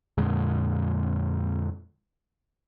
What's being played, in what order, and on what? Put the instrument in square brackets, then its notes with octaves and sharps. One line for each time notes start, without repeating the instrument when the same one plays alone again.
[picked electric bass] F2 A#2 D3 G#3